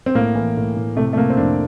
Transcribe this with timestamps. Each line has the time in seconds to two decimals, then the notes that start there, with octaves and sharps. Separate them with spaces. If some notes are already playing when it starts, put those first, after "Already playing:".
0.06 C4
0.15 A2 A#3
0.35 E3
0.57 A2
0.76 A2
0.96 C3 A3
1.13 A3
1.17 C3 A#3
1.30 C4
1.37 F2 D4